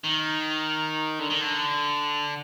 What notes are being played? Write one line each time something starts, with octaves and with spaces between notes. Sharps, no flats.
D#3
D3
D#3
D3